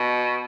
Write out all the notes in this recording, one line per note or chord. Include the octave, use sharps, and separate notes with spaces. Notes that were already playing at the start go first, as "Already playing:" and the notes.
Already playing: B2